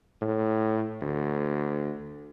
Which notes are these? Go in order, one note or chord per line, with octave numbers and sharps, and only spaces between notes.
A2
D2